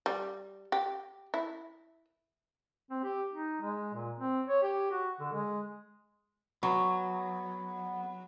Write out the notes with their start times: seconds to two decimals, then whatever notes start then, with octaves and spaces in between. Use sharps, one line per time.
0.06 G3
0.72 G4
1.34 E4
2.91 C4
3.04 G4
3.33 D#4
3.62 G#3
3.94 A#2
4.18 C4
4.47 C#5
4.63 G4
4.91 F#4
5.20 D3
5.33 G#3
6.63 F#3 B3